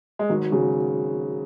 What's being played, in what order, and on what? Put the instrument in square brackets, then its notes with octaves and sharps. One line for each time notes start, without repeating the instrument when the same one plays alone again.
[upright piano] G#3
[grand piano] G#1 [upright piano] F#3
[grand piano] C#3 [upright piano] F#3